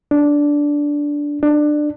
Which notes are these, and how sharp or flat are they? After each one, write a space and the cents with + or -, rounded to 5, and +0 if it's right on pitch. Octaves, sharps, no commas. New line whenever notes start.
D4 -10
D4 +20